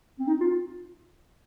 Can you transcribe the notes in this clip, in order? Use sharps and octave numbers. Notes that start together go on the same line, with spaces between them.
C4
D#4
F4